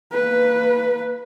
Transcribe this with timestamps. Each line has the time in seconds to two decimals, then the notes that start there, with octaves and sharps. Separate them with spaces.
0.13 A#3 B4